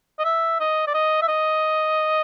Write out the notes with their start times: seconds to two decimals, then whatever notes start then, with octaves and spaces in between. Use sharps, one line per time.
0.19 D#5
0.25 E5
0.60 D#5
0.87 D5
0.94 D#5
1.22 E5
1.28 D#5